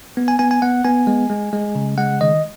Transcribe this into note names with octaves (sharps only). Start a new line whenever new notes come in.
B3
G#5
B3 G#5
G#5
B3 F#5
B3 G#5
G#3
G#3
G#3
C#3
G#3 F#5
D#3 D#5